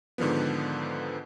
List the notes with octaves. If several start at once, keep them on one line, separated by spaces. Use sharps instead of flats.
G#2 D3 D#3 F3 B3